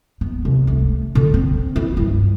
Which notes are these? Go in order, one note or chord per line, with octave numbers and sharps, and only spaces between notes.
B3
C2
A3
D3
C4
E4
G2